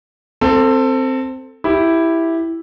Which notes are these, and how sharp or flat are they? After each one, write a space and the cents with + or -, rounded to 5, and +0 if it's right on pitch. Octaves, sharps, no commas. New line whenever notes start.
C4 +0 A4 +20
E4 +0 G4 +0